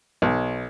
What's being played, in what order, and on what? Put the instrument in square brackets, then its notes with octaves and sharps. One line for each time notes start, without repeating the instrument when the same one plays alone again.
[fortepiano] B1